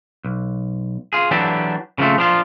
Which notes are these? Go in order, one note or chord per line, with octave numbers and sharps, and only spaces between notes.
B1
F4 G#4
E3 F#3 D4 G4 A4
C#3 F3 G3 A3 C4
F3 D4 F4